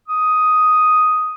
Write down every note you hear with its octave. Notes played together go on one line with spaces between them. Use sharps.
D#6